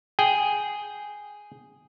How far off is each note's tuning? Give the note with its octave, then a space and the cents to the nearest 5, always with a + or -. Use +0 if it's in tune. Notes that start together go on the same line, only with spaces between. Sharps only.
G#4 +0 G5 +0